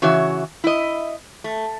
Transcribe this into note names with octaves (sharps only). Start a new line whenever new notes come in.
C#3 E3 F#4 C#5 E5
E4 D#5
A3